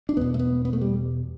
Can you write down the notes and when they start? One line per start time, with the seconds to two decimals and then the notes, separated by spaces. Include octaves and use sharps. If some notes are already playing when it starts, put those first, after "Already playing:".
0.09 D4
0.17 E2 B2 B3
0.34 A3
0.39 B3
0.65 B3
0.73 A3
0.81 G3